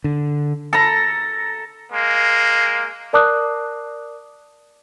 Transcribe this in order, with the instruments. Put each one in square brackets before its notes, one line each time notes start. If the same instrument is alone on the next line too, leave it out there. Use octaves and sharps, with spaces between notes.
[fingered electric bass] D3
[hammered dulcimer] A4 A#5
[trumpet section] G#3 A#3
[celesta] A#4 D5 A5 D6 D#6 F#6